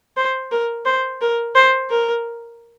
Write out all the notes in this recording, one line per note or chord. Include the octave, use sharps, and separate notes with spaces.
C5
A#4
C5
A#4
C5
A#4